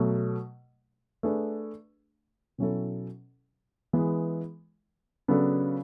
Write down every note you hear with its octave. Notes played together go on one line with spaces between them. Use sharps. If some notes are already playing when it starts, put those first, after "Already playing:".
Already playing: B2 F#3 A3
A3 D4 G#4 B4
B2 F#3 C#4 E4 A4
E3 G#3 B3
C#3 F#3 B3 D4 A4